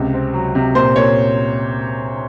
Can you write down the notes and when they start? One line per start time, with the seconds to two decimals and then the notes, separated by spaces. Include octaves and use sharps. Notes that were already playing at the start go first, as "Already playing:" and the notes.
Already playing: C#2 C3
0.14 C4
0.34 F#3
0.55 C3
0.75 A#2 C5
0.96 A#2 C#5